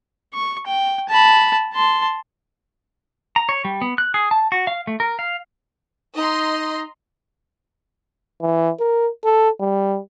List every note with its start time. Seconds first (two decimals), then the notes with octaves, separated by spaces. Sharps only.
0.34 C#6
0.66 G5
1.08 A5 B5
1.73 A5 C6
3.36 A#5
3.49 C#5
3.65 G3
3.81 B3
3.98 F#6
4.14 G#4
4.31 A5
4.52 F#4
4.67 F5
4.87 A3
5.00 A#4
5.19 F5
6.16 D#4 D#5 A#5 C6
8.41 E3
8.79 A#4
9.24 A4
9.60 G3